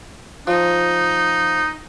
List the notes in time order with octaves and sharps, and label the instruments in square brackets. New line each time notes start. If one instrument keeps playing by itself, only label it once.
[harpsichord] F3 [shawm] D#4